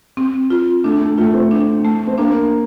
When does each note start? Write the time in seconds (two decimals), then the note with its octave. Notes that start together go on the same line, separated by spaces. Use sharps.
0.17 C4
0.50 F4
0.84 A3 D4
1.01 A3
1.18 A3 F4
1.34 C4
1.51 D4
1.85 A3
2.07 C4
2.18 A#3 D4